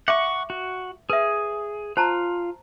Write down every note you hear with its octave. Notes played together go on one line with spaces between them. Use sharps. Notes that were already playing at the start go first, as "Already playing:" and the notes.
E5 F#5 C#6 D6
F#4
G#4 B4 E5
F4 C5 A5 A#5